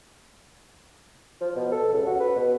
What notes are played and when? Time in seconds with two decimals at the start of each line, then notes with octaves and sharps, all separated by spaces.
1.41 F3
1.56 B2
1.72 A4
1.92 C#2
2.07 F#4
2.20 B4
2.36 B2